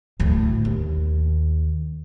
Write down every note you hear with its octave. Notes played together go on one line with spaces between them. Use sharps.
D2 A2
D#2